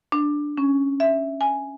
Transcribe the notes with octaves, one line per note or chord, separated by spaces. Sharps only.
D4
C#4
E5
G#5